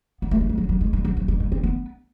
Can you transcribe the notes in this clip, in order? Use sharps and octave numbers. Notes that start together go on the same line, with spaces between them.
B3
A3
G#3
G3
F#3
F#3
G#3
G3
F#3
F3
G3
G#3
C4
B3